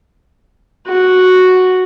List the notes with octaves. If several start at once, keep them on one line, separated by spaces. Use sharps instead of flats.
F#4